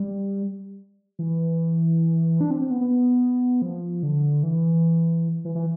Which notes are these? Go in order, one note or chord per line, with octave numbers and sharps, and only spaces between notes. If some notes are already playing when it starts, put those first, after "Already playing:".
Already playing: G3
E3
D4
C4
C4
B3
B3
F3
D3
E3
E3
E3